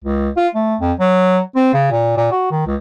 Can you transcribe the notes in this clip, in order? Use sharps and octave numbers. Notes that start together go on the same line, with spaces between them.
C#2
F4
A3
F2
F#3
C4
C#3
A#2
A#2
F#4
D#3
C#2